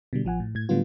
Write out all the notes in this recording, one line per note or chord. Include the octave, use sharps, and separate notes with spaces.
B2 D3 G3
A1 F3 F#5 G#5
A2
A2 G#6
A2 D3 F#3 G3 B3 F4